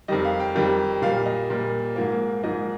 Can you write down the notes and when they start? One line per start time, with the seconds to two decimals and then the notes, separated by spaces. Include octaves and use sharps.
0.08 F2 D#3 G3 D#5
0.25 F5
0.40 G5
0.55 F2 D#3 G3
1.02 A#2 G3 A#3 F5
1.26 D#5
1.50 A#2 G3 A#3
1.96 G#2 F3 A#3
2.43 G#2 F3 A#3 D#5